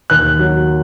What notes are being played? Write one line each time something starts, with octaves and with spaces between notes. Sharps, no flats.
D#2 F#6
F#3